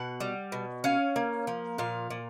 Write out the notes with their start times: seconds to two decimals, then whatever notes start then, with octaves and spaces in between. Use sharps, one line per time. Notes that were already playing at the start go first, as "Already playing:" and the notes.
Already playing: B2 F#5
0.20 G3
0.52 B2
0.84 C#4 F5
1.16 A#3
1.47 F3
1.78 A#2 F5
2.10 A#2